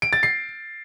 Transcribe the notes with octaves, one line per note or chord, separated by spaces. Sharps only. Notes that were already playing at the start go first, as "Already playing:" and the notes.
D7
A6
C7